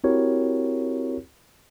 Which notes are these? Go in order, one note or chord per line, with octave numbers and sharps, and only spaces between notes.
C4 E4 F#4 G4 A#4 C#5